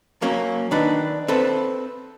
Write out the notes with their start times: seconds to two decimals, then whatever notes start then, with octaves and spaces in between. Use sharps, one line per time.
0.22 F#3 A#3 C#4
0.71 D#3 D4 B4
1.28 C4 A4 B4